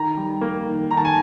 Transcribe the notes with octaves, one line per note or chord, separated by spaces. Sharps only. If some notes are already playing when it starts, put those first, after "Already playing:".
Already playing: D#3 A#5
G3
A#3
D#3
D#3 A#5
A5
G#5